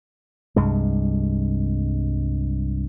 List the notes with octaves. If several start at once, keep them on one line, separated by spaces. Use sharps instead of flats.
C2 G2 G#3